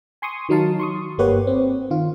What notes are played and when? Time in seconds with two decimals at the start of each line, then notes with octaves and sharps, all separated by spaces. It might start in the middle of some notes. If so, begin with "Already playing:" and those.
0.22 G#5 C6 C#6 D#6
0.49 D#3 F#3 D#4 F5 A5
0.80 C6 C#6 D#6
1.18 G1 A#3 G4 B4 C#5 F#5
1.47 C4
1.90 D#3 F4